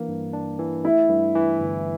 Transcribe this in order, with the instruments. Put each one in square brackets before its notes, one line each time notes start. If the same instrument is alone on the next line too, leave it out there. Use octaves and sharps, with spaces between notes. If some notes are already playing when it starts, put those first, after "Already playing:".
Already playing: [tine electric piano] E3 A#3 D4
G2
D4
E3
[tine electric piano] A3 [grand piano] E4
[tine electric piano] G2
E3
G1